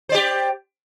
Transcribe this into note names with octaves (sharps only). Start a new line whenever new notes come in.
G4 C5 D5